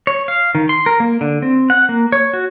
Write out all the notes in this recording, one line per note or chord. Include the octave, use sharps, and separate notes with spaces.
C#5
F5
D#3
C6
A#4
A#3
D3
C4
F#5
A#3
C#5
F#4